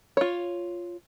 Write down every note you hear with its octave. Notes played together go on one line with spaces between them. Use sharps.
F4 C#5